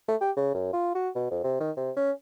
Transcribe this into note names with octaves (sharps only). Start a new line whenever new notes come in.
A3
G4
C#3
F#2
F4
F#4
B2
F2
C3
D#3
C3
C#4